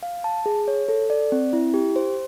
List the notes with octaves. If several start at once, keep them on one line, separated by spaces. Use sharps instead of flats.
F5
A5
G#4
C#5
A4
D5
C4
E4
G4
C5